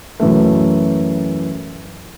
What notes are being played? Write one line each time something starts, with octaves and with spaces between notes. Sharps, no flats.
F#2 E3 A3